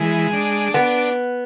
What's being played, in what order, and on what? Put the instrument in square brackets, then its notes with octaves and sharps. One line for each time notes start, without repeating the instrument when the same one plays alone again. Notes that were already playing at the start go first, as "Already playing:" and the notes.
Already playing: [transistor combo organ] E3 G#3
D4
[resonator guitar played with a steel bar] B3